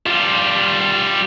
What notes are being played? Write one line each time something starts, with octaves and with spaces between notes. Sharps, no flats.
G3 F4